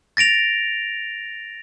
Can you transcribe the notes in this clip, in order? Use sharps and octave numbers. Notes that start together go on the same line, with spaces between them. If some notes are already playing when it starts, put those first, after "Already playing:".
A6 A#6 D7 F7